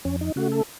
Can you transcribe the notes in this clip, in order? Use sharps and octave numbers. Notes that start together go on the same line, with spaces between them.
F2 C#4
D#4
C#3 A3 F#4
A4